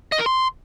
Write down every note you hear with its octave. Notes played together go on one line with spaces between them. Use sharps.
D#5
A#4
C6